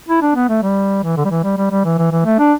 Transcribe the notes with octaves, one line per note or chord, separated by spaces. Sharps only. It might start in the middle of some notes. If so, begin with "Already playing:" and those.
E4
D4
B3
A3
G3
E3
D3
G3
E3
G3
G3
G3
E3
E3
E3
A3
D4